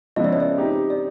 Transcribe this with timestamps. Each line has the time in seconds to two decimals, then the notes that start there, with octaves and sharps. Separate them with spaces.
0.16 C#3 F3 G#3 B3 E4 D#5
0.24 D5
0.33 C#5
0.40 D5
0.58 C4 D#4 G4
0.90 D5